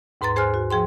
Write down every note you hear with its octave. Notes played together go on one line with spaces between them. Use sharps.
D#2 G#2 B4 A#5 C6 A6
G#4 C5 G#5 C6 F6 F#6
F#4
F3 G#4 G5 C6